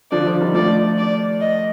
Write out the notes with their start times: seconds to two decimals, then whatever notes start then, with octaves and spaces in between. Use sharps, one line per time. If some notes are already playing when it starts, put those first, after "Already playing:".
0.11 D3 F3 D5
0.26 D3 F3
0.40 D#3 G3
0.54 F3 A3 D5
0.98 D5
1.41 D#5